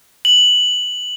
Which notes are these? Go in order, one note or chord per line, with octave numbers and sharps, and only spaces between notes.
F#7